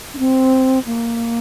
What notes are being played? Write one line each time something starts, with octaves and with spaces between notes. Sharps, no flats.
D4
C4
A#3